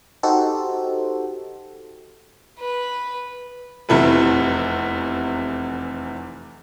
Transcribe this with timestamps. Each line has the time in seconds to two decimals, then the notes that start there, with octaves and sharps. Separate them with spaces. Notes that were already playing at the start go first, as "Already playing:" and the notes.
0.23 D#4 F#4 G4 A4 C5
2.59 B4
3.89 F1 E2 C3 E4 A4 B4